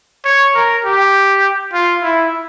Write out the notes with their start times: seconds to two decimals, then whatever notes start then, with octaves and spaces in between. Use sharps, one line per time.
0.25 C#5
0.55 A#4
0.85 G4
1.73 F4
2.03 E4